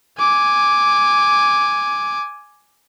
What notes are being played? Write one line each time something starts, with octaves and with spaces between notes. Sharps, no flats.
G#5 D6